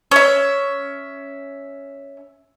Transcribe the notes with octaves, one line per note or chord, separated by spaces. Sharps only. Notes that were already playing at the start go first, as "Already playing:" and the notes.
C#4 E5